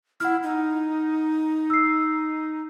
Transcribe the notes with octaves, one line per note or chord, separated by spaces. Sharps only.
E4 F#5 F6
D#4
E6 C7